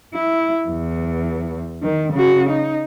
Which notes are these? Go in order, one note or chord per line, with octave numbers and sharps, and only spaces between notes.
E4
E2
D#3
C#3 F#4
D#4